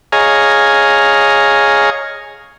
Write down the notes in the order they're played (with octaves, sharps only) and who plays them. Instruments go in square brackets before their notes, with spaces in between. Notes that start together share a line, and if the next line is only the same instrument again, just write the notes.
[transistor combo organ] G#4 C#5 D#5 F5 G#5 A#5